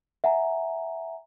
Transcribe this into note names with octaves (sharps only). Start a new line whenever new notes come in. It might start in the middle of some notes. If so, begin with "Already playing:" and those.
E5 F#5 G#5 A#5